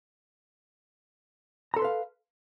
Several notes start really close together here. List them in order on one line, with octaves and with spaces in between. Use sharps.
A#5 A4 C6 B4 F5